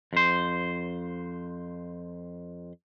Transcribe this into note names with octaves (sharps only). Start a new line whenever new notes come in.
F2 C5